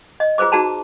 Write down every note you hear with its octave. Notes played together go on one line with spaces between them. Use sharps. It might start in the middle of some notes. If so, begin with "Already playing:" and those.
D#5
F4 G#4 B4 C5 D6
D#4 F#4 G#4 A5 A#5